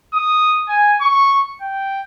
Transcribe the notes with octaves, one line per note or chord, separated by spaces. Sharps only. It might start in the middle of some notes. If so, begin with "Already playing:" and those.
D#6
G#5
C#6
G5